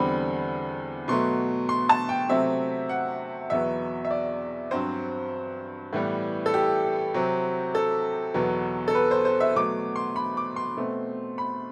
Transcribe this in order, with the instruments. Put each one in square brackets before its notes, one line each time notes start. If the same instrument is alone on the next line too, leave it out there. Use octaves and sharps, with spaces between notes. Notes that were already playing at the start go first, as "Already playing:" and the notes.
Already playing: [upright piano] E2 D3 G3 C4 B5
B2 F#3 A3 C6
C6
A5
G5
C3 F#3 A3 C4 E5
F#5
E2 B2 F#3 B3 E5
E5
D5
G2 F#3 C4 C5
A2 E3 G3 B3
A4
G4
C3 F#3 C4
A4
E2 B2 F#3 B3
A4
B4
C5
C5
E5
B2 F#3 A3 D6
C6
B5
D6
C6
B2 A3 C4
B5